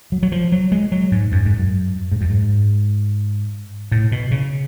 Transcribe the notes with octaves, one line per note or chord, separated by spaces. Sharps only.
F#3
F#3
F3
F#3
G#3
F#3
G#2
F#2
G#2
F#2
G#2
F#2
G#2
A2
B2
C#3